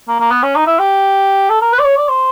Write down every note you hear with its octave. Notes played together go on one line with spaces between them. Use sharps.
A#3
A#3
B3
C#4
D#4
E4
G4
A4
A#4
B4
D5
C#5
D5
C5